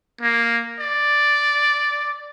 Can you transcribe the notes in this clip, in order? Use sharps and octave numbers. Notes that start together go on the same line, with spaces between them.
A#3
D5